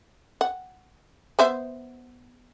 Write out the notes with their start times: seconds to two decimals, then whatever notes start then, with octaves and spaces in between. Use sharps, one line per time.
0.41 F#5
1.39 B3 C5 E5